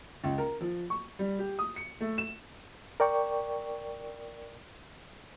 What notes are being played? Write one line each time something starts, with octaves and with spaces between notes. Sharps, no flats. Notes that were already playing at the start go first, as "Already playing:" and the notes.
C#2
A#4
F3
C#6
G3
G4
D#6
C#7
A3
E7
A#4 D5 G5 C#6